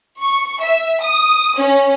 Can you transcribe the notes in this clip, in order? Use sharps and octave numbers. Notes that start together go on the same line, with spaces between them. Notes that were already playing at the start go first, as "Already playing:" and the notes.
C#6
E5
D#6
C#4